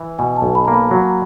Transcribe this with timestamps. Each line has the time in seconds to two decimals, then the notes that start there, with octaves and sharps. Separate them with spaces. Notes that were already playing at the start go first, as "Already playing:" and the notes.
Already playing: E3
0.19 B2 G#5
0.36 A5
0.42 B1
0.55 B5
0.65 A#3 A#5
0.74 B5
0.91 F#3